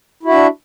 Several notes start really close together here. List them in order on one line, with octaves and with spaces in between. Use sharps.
E4 F#4 E5 D4